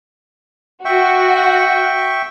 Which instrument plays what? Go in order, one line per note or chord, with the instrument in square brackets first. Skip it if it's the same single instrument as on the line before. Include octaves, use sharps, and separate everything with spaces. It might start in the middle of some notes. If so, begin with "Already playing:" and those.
[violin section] F#4 [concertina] E5 G5 C#6